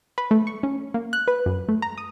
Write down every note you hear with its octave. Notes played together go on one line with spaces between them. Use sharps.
B4
A3
C#6
C#4
A#3
F#6
B4
F#2
A3
A#5
D#6